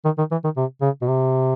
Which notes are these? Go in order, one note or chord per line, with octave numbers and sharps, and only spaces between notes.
D#3
D#3
E3
D#3
C3
C#3
B2
C3